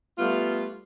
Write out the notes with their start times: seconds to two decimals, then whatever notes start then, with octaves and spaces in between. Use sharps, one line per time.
0.18 G3 A3 B3 F4